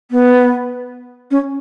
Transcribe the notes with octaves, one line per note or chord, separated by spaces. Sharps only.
B3
C#4